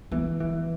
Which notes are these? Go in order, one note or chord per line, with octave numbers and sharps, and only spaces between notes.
E3 B3
E3